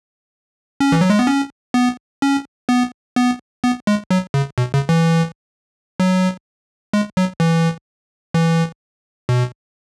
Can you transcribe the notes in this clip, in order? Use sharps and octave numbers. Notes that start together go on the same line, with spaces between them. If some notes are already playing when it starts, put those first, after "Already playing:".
C#4
E3
F#3
G#3
B3
C#4
B3
C#4
B3
B3
B3
G#3
F#3
C#3
B2
C#3
E3
F#3
G#3
F#3
E3
E3
B2